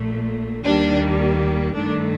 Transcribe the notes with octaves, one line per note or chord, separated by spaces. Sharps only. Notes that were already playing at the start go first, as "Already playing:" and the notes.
Already playing: A#1 A#2 A3
D#2 D#3 G3 A#3 D4
G2 D#3 A3 D4